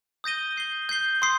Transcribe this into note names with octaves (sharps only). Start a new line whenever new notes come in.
D#6 G6 A#6 D#7 G7
G6 C7 G7
G6 C7 G7
C6 D#6 C7